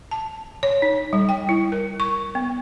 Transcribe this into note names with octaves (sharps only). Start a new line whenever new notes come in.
A5
C#5
D#4
G3
G5
E4
A#4
C#6
B3